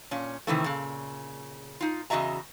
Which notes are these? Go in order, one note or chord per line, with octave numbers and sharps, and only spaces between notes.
A#2 C#4
C3 D#3 E3 A3
A#2 C#3
D#4 F4
E2 C#3 F#4 D#5 E5 A#5